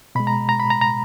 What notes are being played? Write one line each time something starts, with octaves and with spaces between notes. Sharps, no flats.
B2 G#3 B5
A#5
A#5
B5
A#5
A#5